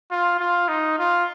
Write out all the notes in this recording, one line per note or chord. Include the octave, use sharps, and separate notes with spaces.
F4
F4
D#4
F4